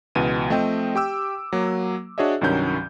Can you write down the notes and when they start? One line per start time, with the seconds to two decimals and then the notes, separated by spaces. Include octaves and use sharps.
0.15 C#2 B2 E3 D#7
0.50 F3 A3 C4 D#5 G5
0.95 G4 G5 D6 E6
1.53 F#3 A#3
2.18 D4 F#4 G#4 C#5 D#5 E5
2.41 C2 G2 D#3 F#3 C#4 G6